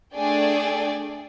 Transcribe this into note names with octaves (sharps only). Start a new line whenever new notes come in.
A3 D4 G#4 D5 G5 G#5